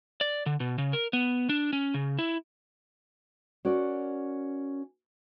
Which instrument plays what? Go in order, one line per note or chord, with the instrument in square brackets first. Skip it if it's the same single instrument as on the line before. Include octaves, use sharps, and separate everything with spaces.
[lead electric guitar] D5
D3
B2
C#3
A#4
B3
D4
C#4
C#3
E4
[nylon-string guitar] C#4 F#4 A#4 D5